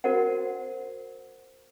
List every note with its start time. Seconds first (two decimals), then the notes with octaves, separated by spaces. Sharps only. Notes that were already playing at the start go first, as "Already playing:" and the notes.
0.04 F#4 A#4 C5 D5 F#5